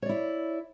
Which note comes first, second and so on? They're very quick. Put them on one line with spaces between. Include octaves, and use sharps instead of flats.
C#5 D5 E4